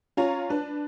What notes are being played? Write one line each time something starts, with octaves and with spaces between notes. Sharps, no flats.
C#4 F4 C#5 A#5
D4 B4